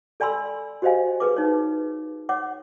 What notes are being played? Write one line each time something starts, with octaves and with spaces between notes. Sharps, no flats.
A4 D5 G#5 B5 C6 E6
F#4 G4 C5 D#5 F5 G#5
G#4 B4 D6
D#4 C#5
C#5 F#5 D6